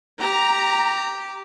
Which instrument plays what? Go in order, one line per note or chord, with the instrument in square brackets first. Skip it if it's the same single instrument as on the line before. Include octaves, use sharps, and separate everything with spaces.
[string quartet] G4 [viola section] A#5